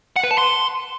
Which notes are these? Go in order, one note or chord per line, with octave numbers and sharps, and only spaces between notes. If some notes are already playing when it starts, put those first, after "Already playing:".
F#5
B4
A5
C6